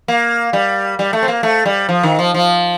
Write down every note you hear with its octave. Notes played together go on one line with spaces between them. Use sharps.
A#3
G3
G3
A3
C4
A#3
A3
G3
F3
D#3
F3
F3